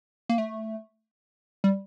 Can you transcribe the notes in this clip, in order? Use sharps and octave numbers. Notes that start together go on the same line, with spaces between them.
A#3
A3
G3